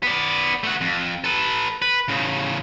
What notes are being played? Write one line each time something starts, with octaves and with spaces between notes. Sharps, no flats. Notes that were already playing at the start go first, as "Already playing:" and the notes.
B3 D5
A3 F#5
F2
A4 B4
B4
A2 C#3